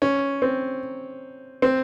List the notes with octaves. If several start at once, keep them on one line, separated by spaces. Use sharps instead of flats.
C#4
C4
C4